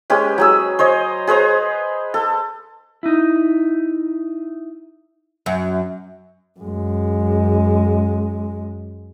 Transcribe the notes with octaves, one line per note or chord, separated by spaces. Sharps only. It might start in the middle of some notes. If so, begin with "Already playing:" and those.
G#3 C#4 G4 B4
F#3 G#4 E6
C5 C#5 D#5
G#4 B4 C5 A#5
A4
D#4 E4
F#2
F#2 G#3